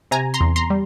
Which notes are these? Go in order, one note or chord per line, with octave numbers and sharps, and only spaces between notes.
C3 G#5 A#5
A#5 C6
E2
A#5 C6
G3